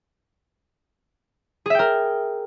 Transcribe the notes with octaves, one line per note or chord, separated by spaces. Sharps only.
G#4 A#4 E5 G5